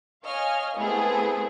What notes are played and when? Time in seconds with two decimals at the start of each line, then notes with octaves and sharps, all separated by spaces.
0.24 C#5 D#5 F5 G#5 F6
0.77 A3 B3 C4 E4 G#4 A4